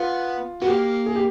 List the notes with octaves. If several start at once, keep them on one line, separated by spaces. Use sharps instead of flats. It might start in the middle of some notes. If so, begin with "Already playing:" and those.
Already playing: B3 F4
B3 F#4
A#3 G4
G#4
G4